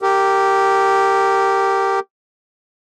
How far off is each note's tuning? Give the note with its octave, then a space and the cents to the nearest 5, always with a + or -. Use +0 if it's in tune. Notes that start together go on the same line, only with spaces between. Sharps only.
G4 -5 A#4 -20